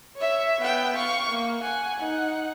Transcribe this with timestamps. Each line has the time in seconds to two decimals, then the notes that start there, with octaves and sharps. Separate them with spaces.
0.17 C#5 E5
0.61 B3 G5
0.97 F5 C#6
1.31 A#3
1.62 F#5 G#5
2.00 D#4 F#5